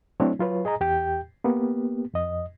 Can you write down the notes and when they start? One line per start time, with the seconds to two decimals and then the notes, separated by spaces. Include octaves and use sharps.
0.20 F#3 A3 C4 D4 E4 C#5
0.39 F#3 F4 B4 C#5
0.65 G#4 D#5 G#5 A#5
0.80 E2 G4 G5 G6
1.44 A#3 B3 G4
2.14 F2 D#5